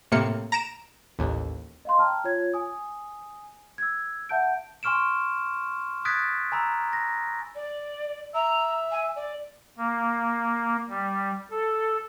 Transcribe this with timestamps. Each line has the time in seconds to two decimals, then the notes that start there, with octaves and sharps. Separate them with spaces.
0.12 A2 C3 A#3 C#7
0.52 A#5 A#6 D7 E7
1.19 A1 D#2
1.85 D#5 F5 C6
1.99 G5 A5 A#5 F6
2.24 F4 C#5 G#6
2.54 G#5 D#6
3.78 E6 G#6
4.29 E5 F#5 A5 G6 D7
4.83 G#5 C6 C#6 F6 D7 E7
6.05 D#6 F#6 G#6 A6 B6 D7
6.52 G#5 A#5 B5 E6
6.93 A#6
7.55 D5
8.34 E5 A#5
8.91 G#5
9.16 D5
9.78 A#3
10.89 G3
11.51 A4